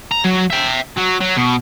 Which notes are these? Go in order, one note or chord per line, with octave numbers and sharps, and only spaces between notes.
A#5
F#3
E5 G5
F#3
F#3
B2